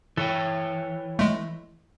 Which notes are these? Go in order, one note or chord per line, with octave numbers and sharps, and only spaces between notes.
E3 A4 C#5 G5
G#3 A3